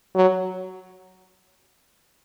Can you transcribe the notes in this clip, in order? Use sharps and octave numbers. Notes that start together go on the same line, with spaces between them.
F#3